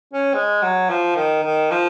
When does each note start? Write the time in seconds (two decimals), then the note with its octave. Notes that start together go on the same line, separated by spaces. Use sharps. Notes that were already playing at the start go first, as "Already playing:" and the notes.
0.13 C#4
0.34 G#3
0.62 F#3
0.90 F3
1.16 D#3
1.44 D#3
1.71 F3